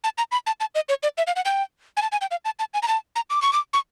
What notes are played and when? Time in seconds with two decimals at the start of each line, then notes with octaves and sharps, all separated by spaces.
0.04 A5
0.18 A#5
0.31 B5
0.47 A5
0.60 A5
0.75 D#5
0.89 C#5
1.03 D5
1.18 E5
1.27 F5
1.36 F#5
1.45 G5
1.97 G#5
2.02 A5
2.12 G#5
2.21 G5
2.31 F5
2.45 A5
2.59 A5
2.74 G#5
2.82 A#5
2.88 A5
3.16 A#5
3.30 D6
3.42 C#6
3.53 D6
3.73 C#6